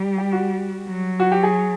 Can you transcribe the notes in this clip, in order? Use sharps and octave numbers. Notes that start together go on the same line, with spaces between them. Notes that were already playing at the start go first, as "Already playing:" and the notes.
Already playing: G3
G4
F#4
F#3
F#4
G4
G#4